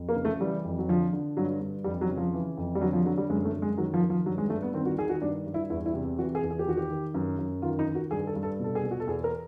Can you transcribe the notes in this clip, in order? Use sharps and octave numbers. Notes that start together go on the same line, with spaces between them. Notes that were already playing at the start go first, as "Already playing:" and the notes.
Already playing: F2
A#3
C#3
A3
E3 G3
F2
F#3
D3 F3
D3
G2 F#3
G2
F2 G3
F#3
C#3
F3
E3
F2
G3
D3 F#3
F3
D3 F#3
G3
F#2 G#3
A3
F#2
G#3
D#3 F#3
F3
D#3
F3
G2 F#3
G#3
G2 A3
B3
D#3 C4
F#4
D#3 G#4
F#4
G2 D4
G2
E4
E2 E4
E4
C3
E3 F#4
G#4
E2
G#4
G4
D#3 F#4
G4
D#3
F#2
F#2
D#3 F4
D#4
D#3
F#4
G2 G#4
A4
G2
A4
B2 A4
G#4
B2
F#4
A4
E2 G#4
A#4